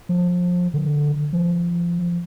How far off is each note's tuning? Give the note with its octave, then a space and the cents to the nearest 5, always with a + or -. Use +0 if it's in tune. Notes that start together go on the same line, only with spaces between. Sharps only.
F3 +25
D3 +0
F3 -20